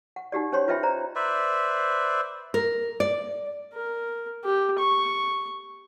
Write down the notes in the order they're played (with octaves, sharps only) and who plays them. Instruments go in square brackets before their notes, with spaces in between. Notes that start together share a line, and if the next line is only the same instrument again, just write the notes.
[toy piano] F#5
D#4 F#4 G4 D5
C#4 C5 C#5 C6
F4 B4 D#5 E5 G5 B5
C5 D5 A#5
[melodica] B4 C5 D5 E5
[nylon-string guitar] A#4
D5
[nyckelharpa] A#4
G4
C#6